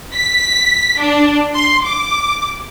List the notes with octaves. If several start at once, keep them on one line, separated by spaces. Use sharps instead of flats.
B6
D4
C6
D6